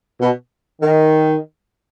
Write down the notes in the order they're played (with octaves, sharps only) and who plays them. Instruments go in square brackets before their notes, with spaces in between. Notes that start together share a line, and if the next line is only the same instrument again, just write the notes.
[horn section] B2
D#3